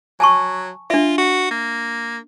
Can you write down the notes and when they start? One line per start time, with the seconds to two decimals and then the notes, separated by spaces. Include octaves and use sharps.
0.20 F#3 G#5 A5 C#6
0.90 D4 F4 E5
1.18 F#4
1.51 A#3